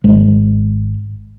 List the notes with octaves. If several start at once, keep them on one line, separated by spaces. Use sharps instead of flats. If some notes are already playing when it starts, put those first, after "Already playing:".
G#1 G#3